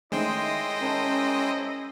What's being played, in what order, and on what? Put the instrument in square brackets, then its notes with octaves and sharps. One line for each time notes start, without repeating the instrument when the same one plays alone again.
[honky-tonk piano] D#3 A3 C#4 [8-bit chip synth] G#3 C5 G5 [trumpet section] E4 D#5
[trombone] C#4 [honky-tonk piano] A#4 A5 B5